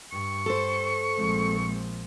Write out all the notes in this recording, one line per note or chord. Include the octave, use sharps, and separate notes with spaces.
G2 C#6
A4 C5
A#1 F3 G#3 C4